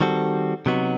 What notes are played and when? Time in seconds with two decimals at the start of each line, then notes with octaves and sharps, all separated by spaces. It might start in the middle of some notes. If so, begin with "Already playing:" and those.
0.01 D#3 G3 C4 F#4 A4
0.66 C3 F#3 B3 D#4 F#4